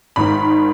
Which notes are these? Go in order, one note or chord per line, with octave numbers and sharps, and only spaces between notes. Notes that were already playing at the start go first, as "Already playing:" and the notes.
G#1 G#2 D#3 B5